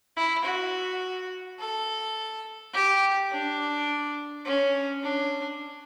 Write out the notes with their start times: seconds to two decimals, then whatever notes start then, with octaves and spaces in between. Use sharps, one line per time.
0.17 E4
0.45 F#4
1.60 A4
2.74 G4
3.32 D4
4.46 C#4
5.03 D4